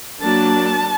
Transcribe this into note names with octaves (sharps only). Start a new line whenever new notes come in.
F#3 A#3 D4 A5